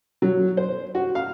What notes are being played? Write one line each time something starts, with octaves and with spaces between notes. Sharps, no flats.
F#3
C5
F#4
F5